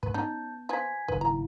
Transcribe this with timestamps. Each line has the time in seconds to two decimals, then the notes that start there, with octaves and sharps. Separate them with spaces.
0.03 G#2 B4
0.14 B3 C#4 D#4 A5 G6
0.69 F3 B4 G#5 G#6 B6
1.08 F#1 G#2 D#3 B4
1.21 E4 A#5